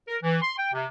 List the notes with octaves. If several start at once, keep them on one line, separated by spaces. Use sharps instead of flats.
A#4
E3
C6
G5
C3